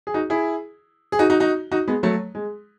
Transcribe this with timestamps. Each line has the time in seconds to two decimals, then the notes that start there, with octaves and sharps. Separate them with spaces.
0.07 G#4
0.14 D#4 F#4
0.30 E4 G#4
1.12 G#4
1.19 D#4 F#4
1.30 D#4 F#4
1.40 D#4 F#4
1.72 D#4 F#4
1.88 G#3 B3
2.03 F#3 A3
2.35 G#3